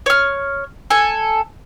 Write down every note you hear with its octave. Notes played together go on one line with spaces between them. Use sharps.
C#5 F6
A4 G#5